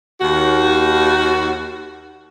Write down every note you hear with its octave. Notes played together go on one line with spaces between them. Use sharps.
D#2 F#4